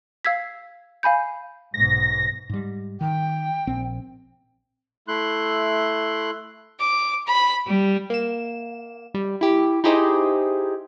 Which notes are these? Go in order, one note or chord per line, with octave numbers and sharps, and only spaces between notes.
F5 E6 G#6 B6
F5 G#5 B5 G6
B1 G#2 B2 A#6
G#2 G3
D#3 G5
A#1 C4
A3 E4 C6 F#6
D6
B5
G3
A#3 E7
G3
E4 G4
D#4 E4 G4 G#4 C5 D#5